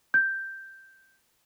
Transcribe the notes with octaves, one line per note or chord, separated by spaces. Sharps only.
G6